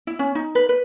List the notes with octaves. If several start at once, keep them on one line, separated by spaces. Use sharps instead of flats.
E4
C#4
D#4
B4
B4